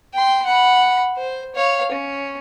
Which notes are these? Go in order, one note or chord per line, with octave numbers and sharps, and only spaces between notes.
G5 C6
F#5 B5
C5
C#5 F5
C#4